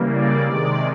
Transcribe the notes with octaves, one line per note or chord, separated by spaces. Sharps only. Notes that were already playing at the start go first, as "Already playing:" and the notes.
Already playing: C#3 E3 G3 A#3
D5
C3 D#3 G#3 D5